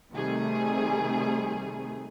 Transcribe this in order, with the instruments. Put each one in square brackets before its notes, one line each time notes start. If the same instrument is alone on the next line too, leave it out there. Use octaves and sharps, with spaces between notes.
[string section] C3 D#3 G3 A3 G#4